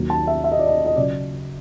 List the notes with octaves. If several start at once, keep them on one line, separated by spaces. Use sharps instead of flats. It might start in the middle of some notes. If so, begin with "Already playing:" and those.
Already playing: D#2 D#3 F#3
A5
E5
E5
D#5
D5
D#5
D#5
C#3 F#3 D5